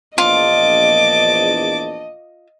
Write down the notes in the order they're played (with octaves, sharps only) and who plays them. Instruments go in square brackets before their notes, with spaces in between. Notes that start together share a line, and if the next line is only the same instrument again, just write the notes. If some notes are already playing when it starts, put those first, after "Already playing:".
[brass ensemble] A#1 E2 A5 [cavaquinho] F4 [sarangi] D#5 [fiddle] D6